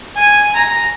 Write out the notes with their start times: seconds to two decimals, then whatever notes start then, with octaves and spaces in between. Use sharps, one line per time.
0.16 G#5
0.55 A#5